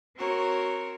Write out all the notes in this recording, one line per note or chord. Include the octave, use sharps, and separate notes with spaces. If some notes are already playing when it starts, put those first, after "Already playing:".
C4 F#4 A#4 C#5